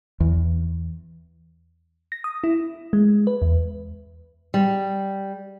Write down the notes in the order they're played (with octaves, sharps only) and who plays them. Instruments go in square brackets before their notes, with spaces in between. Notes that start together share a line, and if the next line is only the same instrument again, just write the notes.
[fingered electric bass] E2
[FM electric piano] A#6
D#6
E4
G#3
B4
E2
[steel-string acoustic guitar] G3